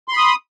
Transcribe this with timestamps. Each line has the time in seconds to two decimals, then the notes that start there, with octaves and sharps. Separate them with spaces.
0.08 C6
0.13 B5
0.17 D#6